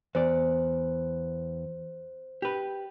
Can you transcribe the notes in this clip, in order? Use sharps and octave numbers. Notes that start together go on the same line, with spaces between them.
E2 C5 D5
G4 B4